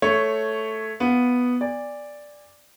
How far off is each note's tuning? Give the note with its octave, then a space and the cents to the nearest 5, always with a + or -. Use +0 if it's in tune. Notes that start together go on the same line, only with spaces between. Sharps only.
A3 +0 C#5 +0
B3 +0 F4 +0
D5 +0 G#5 -30